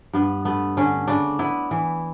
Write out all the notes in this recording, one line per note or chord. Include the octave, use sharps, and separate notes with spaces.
G2 B3
A3 B3
D3 C#4
C#3 D4
B3 E4
E3